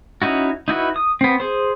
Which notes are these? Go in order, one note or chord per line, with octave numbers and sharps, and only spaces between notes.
C#4 D#4 E4 F#4
D#4 E4 F#4 B4
D#6
B3 C4
G#4 C5